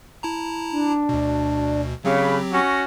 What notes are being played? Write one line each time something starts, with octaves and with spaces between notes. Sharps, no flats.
E4 A5 A#5
D4
D2 B2
C#3 F#3 C4 G4 B5
C#4 F#4 A#6